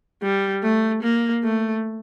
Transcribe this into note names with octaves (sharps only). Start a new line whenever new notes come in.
G3
A3
A#3
A3